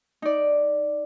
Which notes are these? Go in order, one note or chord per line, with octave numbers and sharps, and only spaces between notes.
D#4 D5